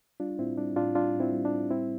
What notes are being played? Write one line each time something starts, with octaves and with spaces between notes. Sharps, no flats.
G3 D4 F4
A2 C4 E4
G3 D4
A2 D4 F4
G3 D4 F4
A2
C4 E4
G3
D4
A2
G3 C4 E4